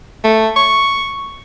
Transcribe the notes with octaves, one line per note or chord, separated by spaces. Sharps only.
A3
C#6